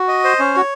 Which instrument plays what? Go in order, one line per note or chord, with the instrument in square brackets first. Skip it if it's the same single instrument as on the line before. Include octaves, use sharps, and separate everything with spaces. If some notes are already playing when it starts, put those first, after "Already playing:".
Already playing: [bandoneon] F#4
[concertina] D#5
C5
C#4
[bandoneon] F#4 [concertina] C#5